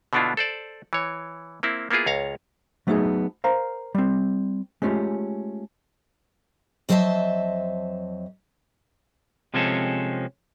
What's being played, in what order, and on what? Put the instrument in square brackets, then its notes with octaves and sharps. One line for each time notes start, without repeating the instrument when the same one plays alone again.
[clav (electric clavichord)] B2 D3 B3 D4 E4 F4
A4 C5 D5
E3 C#5
A#3 C4 E4
A#3 B3 E4 F4 G#4
C#2 C#5 F5 A#5
[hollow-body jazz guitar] F#3 A3 B3 D4 D#4 G#4
A#4 C5 F5 A#5
G3 C4
G#3 A3 C#4 F4 G4
[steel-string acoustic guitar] F2 F#3 C5 D#5 E5 A5
[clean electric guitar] C3 F3 G#3 C4 C#4 A4